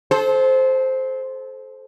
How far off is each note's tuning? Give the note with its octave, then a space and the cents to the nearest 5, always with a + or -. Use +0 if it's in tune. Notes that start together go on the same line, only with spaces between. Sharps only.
A4 -30 C5 +0